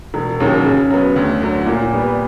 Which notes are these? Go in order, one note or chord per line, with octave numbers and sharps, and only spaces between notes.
E1
D#2 C#3 F#3
C#3
F#3 B3
D2
D3 F#3
A#2
G3 B3